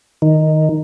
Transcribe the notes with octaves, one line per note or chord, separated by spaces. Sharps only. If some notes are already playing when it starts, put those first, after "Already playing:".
D#3